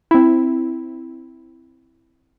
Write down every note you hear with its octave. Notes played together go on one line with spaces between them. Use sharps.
C4 E4